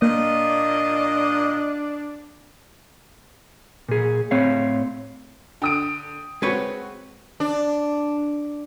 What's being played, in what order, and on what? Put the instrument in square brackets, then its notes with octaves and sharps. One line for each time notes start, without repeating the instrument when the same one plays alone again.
[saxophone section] A#2 D#5 [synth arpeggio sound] A#3 [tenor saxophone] D4
[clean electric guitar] A#2 G#4
A2 C4 C#5 F5
[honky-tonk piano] D3 [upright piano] G5 D#6 D7
[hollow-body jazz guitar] G#3 B4 C#5 [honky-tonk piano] C4 F#4
[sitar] D4